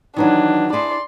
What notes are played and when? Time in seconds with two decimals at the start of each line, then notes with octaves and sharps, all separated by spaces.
0.16 D#3 E3 F#3 D4
0.73 D4 E4 G#4 D5 C6